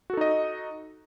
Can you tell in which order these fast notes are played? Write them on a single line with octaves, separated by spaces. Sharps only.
F#4 A4 D#4 D#5